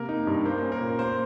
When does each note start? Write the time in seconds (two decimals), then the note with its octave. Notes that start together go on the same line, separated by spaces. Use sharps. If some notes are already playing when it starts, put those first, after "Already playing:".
Already playing: C3 A#3 A#4
0.09 D#4
0.27 G2
0.45 A#3 C5
0.63 C#4
0.72 A#4
0.81 A#2
0.99 A#3 C5